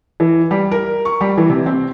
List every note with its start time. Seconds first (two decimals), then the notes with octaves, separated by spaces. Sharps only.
0.20 E3
0.51 G3
0.71 A#4
1.05 C#6
1.21 G3
1.38 E3
1.50 C3
1.66 C4